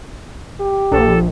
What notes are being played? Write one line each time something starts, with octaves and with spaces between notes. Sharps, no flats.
G4
A#1 A4